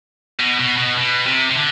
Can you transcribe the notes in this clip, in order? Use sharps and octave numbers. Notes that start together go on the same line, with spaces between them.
B2
B2
B2
B2
C3
C3
D3